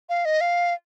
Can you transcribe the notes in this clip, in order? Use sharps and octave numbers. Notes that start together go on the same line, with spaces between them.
F5
D#5
F5